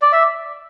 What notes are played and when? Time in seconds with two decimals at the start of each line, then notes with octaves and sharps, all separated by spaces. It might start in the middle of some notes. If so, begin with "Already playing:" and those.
0.02 D5
0.12 E5